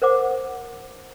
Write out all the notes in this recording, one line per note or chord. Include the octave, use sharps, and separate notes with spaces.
A#4 C5 F#5 D6